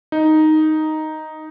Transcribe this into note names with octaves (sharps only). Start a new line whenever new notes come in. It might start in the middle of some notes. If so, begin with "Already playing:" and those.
D#4